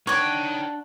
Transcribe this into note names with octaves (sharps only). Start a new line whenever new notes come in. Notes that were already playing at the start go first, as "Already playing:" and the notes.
D4 D#4 C#5 F#5 G5 C#6 D6